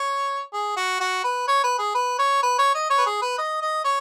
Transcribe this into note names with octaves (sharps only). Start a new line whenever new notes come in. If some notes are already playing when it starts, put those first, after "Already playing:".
Already playing: C#5
G#4
F#4
F#4
B4
C#5
B4
G#4
B4
C#5
B4
C#5
D#5
C#5
B4
G#4
B4
D#5
D#5
C#5